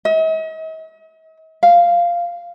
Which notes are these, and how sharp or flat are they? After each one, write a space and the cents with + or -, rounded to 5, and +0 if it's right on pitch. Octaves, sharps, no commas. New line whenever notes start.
D#5 +45
F5 -5